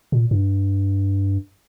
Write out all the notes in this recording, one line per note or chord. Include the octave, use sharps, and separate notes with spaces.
A#2
G2